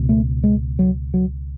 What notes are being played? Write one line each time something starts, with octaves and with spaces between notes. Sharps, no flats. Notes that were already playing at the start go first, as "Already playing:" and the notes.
Already playing: C#2 B2
A3
G#3
F#3
F#3